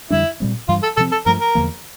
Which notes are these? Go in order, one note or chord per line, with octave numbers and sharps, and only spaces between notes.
F2 D3 G3 D4 E4
A#2 G3 C4
G2 E3 G3 F4
A4
C3 F3 C4 A4
A4
G2 F3 A3 A#4
A#4
E2 D3 F3 A#3